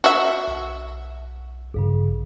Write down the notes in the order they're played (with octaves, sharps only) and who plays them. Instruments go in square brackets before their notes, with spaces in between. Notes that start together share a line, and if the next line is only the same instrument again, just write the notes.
[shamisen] F#4 E5
[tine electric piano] B1
A#1 G2 C#3